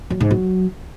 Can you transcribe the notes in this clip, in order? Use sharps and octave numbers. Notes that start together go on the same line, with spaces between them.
F#3
G#2
F#3